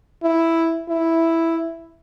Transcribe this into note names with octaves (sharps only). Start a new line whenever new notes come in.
E4
E4